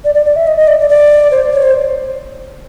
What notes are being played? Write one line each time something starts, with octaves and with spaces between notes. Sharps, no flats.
D5
D5
D5
E5
D#5
D#5
D5
D5
D5
C5
C#5
C5